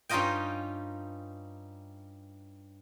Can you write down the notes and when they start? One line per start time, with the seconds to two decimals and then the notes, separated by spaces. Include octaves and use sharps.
0.09 G2 C#4 D#4 F4 D#5 G5